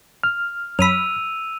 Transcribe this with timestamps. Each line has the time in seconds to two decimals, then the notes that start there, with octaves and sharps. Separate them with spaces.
0.23 F6
0.79 F#2 B5 E6 D#7 F7